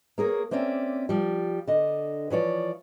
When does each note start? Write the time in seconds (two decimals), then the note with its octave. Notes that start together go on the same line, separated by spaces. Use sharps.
0.18 A#3 G#4 A#4 C#5
0.51 A#3 C4 C#4 D5 E5
1.09 F3 G3
1.68 D3 D#5
2.30 E3 F3 C#5 D5